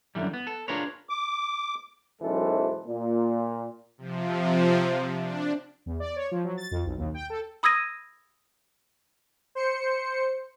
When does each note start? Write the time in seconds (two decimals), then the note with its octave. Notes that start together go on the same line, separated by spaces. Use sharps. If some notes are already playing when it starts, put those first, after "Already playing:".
0.15 F#2 A#2 D3 E3 G3
0.34 B3
0.47 A4
0.68 D4 F4 G#4 A#4 B4 C#5
1.09 D6
2.22 B1 F#2 E3 G#3 A4 C5
2.86 A#2
3.98 C3 F3
5.14 D4
5.86 E2
6.00 D5
6.16 C#5
6.32 F3
6.44 F#3
6.58 A6
6.71 F2
6.86 B1
6.98 D#2
7.14 G5
7.30 A4
7.63 B5 D#6 E6 G#6 A#6 D#7
9.55 C5 C#7